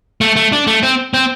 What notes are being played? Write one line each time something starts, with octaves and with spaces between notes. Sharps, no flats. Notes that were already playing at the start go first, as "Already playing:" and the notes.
A3
A3
D4
A3
C4
C4